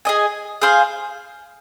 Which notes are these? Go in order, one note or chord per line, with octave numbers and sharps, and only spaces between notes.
G#4 D#5 G#5
G#4 C5 F5